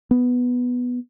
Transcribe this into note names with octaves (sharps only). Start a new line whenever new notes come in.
B3